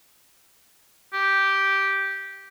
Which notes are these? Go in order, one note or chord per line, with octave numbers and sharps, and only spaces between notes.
G4